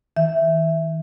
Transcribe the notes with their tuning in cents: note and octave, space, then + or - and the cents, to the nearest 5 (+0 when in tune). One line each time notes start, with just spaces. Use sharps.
D#3 +40 E5 +0